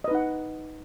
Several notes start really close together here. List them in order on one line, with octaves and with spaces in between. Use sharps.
D#5 B4 D#4 F#5